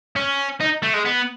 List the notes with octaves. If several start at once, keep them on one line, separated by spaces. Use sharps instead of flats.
C#4
D#4
A3
G#3
B3